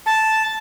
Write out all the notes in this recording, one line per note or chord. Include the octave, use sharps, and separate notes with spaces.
A5